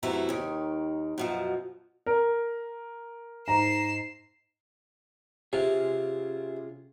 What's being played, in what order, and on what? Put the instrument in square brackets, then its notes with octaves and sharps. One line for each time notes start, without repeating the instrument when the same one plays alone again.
[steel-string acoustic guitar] F#2 C3 E3 A3 E4
D#2 D#3
F#2 B2 F3
[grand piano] A#4
[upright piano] G#2 A#5 [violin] C7 E7
[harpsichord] C3 [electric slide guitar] C#4 F4 G#4